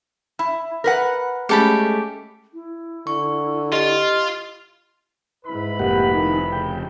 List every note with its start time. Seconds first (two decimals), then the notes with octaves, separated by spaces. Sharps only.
0.39 E4
0.84 A#4 B4 F#5
1.49 G#3 A3 C#4 G4 A4 B5
2.53 E4
3.07 D3 C#6
3.72 F4 G4 D#5
5.45 G#2 E4 B4 B5
5.79 F1 A#3 G4 F#5
6.14 D#3 D#4 E4
6.52 C#3 G5